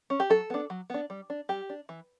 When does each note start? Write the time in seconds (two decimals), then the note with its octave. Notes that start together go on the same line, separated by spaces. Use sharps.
0.10 C#4
0.20 G4
0.30 F#3 A4
0.50 B3 D4
0.70 F#3
0.90 B3 D4
1.10 G3
1.30 D4
1.49 G3 G4
1.69 D4
1.89 E3